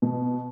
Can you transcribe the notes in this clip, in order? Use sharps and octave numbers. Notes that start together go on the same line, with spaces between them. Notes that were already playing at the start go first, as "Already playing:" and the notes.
B2